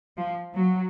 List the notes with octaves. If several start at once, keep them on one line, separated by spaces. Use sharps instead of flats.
F3
F#3